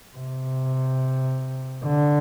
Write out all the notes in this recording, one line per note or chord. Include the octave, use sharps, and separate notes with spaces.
C3
D3